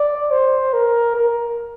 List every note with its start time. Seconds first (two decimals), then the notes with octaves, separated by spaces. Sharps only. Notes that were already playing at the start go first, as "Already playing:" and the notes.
Already playing: D5
0.31 C5
0.73 A#4
1.15 A#4